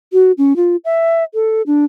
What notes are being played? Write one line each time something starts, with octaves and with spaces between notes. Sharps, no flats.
F#4
C#4
F4
E5
A4
D4